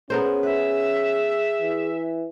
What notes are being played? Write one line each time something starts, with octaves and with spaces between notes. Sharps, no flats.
B3 C#4 G#4 A#4 C5
B4 E5
E3